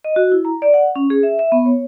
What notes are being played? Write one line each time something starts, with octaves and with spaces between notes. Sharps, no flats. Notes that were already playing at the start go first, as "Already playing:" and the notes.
D#5
F#4
E4
A#5
D5
F#5
C#4
G#4
E5
E5
B3
C#5